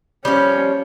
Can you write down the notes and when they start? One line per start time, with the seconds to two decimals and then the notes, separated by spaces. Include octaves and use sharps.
0.25 F3 G3 C#4